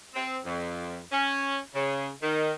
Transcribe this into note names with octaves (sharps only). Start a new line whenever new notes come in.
C4
F2
C#4
C#3
D#3